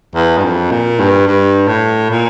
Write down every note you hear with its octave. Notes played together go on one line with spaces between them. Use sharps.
E2
G2
F2
A#2
G2
G2
A2
A#2